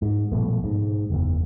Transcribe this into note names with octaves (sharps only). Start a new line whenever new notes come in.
G#2
A#1 G2 B2 A3
G#2
F#1 E2